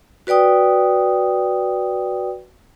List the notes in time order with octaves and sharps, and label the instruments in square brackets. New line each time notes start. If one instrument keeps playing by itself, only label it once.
[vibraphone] F#4 B4 D5 G5 D#6